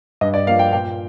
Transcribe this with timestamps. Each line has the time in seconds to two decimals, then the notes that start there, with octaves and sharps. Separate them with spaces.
0.21 G2 D#5
0.34 D5
0.47 F3 A#3 F5
0.59 G5
0.72 A#2 G5